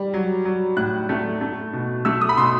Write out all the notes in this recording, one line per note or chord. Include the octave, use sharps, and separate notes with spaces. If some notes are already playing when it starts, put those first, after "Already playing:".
Already playing: G3
F#3
F#3
A2 F#6
A3
A3
B2
A3 E6
D#6
B5
B2 C6